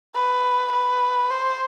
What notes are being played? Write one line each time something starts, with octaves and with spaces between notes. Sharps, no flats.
B4
B4
C5